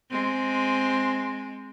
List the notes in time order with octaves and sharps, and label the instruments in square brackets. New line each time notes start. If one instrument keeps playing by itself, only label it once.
[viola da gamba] G#3 C4